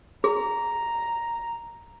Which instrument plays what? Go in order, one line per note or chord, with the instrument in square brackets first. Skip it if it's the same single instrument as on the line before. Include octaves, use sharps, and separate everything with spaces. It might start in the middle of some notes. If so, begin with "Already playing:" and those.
[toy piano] G#4 [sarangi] A#5